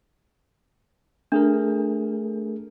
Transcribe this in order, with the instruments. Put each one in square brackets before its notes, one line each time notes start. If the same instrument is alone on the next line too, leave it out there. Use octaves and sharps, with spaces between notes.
[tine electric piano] A3 G#4 A#4 [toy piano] D4